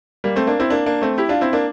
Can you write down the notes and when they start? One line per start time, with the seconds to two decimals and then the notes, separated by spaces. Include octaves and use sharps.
0.24 G3 A#3
0.36 A3 C4
0.47 A#3 D4
0.60 C4 E4
0.70 A#3 D4
0.86 A#3 D4
1.02 A3 C4
1.18 E4 G4
1.29 D4 F4
1.41 C4 E4
1.53 A#3 D4